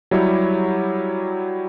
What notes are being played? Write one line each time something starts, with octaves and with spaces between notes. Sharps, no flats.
F#3 G3 E4 G4 C#5